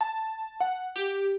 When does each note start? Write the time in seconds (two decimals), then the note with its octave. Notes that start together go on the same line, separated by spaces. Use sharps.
0.01 A5
0.61 F#5
0.96 G4